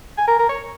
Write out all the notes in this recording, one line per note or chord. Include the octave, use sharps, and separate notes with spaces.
G#5
A#4
A#4
C#5